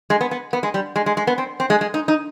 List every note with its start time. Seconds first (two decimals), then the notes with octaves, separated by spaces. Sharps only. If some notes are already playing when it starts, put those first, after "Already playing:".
0.10 G#3
0.21 B3
0.31 B3
0.53 B3
0.63 G#3
0.74 G3
0.96 G#3
1.06 G#3
1.17 G#3
1.27 B3
1.38 C4
1.60 C4
1.70 G#3
1.81 G#3
1.94 D#4
2.08 D#4